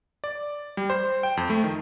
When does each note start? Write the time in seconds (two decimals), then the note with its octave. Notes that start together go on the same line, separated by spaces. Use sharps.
0.24 D5
0.77 G3
0.90 C5
1.23 G5
1.37 F2
1.50 A3
1.64 D#3